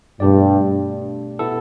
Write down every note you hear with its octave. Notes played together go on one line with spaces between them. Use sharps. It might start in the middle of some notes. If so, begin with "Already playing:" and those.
G2 B2 A3 D4 G4 D5
B2 B3 E4 A4